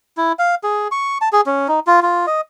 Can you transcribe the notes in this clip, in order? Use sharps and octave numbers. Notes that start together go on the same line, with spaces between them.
E4
F5
G#4
C#6
A5
G#4
C#4
D#4
F4
F4
D#5